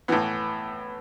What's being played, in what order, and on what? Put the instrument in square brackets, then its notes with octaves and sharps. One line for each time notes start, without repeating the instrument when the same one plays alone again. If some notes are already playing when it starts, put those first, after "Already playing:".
[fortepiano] A2 E3 B3